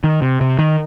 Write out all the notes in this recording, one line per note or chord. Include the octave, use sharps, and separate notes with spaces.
D#3
C3
C3
D#3